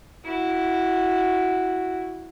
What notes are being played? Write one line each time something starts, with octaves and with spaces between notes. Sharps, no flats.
E4 F#4